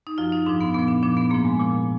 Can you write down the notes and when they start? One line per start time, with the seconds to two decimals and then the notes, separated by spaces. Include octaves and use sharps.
0.07 D#4
0.18 F#2 F3 F4
0.32 D#4
0.46 G#2 F3 D4
0.61 B3
0.75 A#2 F3 B3
0.88 D4
1.03 A#2 F3 D4
1.17 B3
1.31 G#2 F3 A#3
1.45 G#3
1.59 A#2 F3